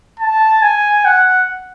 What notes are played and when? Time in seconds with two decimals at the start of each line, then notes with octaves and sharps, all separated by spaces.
0.20 A5
0.62 G#5
1.05 F#5